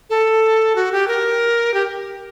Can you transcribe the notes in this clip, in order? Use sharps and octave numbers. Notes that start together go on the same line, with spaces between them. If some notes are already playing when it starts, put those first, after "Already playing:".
A4
F#4
G4
A#4
G4